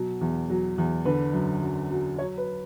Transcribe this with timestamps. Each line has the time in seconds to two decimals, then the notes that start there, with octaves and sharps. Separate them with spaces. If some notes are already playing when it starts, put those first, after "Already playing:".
Already playing: B2 F#3
0.21 E2
0.50 F#3
0.78 E2
1.05 D3 B4
1.33 F#2
1.62 F#2
1.91 F#3
2.18 F#3 C#5
2.38 B4